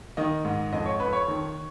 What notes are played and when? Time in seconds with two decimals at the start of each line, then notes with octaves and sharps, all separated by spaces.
0.17 D#3 D#5
0.45 G#2
0.73 F2 D#5
0.86 C#5
1.00 F2 B4
1.13 C#5
1.28 D#3